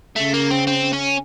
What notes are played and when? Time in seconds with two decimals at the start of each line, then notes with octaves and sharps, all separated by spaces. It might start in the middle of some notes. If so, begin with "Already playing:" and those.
0.16 C#3 A3
0.34 A#3
0.51 C4
0.67 C4
0.93 C#4